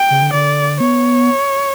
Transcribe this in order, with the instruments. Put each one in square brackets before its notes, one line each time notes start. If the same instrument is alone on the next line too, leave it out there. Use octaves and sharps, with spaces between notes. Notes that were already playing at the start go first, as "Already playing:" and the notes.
Already playing: [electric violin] G5
[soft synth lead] C#3
D3
[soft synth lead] D3 [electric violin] D5
[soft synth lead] B3 [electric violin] C#5